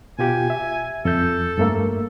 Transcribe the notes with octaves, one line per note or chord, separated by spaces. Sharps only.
B2 F4 G4 G#5
E5
F2 A4 G6
G2 A3 A#3